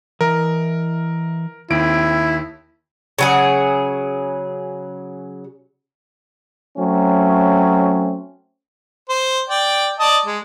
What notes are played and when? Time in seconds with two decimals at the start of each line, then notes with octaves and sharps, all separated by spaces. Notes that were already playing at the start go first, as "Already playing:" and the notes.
0.21 E3 E4 A#4 D#5
1.70 D#2 C4 E4 D7
3.19 C#3 F#3 G#4
6.78 F#3 A3 C4 C#4
9.09 C5
9.49 D5 G5
9.99 D5 D#5 A5
10.25 G#3